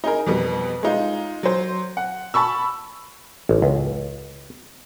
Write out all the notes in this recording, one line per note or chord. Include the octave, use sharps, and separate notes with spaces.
D#4 G#4 A#4
F2 B2 G3 B3
G#3 D#4 F4
F#3 C5
F#5
A5 B5 C#6 E6
A1
C#2